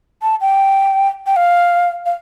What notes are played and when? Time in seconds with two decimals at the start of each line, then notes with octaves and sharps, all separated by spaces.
0.22 A5
0.41 G5
1.26 G5
1.36 F5
2.06 F5